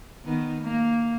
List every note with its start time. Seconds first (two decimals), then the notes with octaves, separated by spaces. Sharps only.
0.25 D#3 B3
0.61 A#3